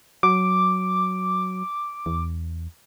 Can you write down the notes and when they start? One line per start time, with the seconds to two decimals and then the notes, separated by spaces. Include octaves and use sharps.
0.23 F#3 D6
2.06 E2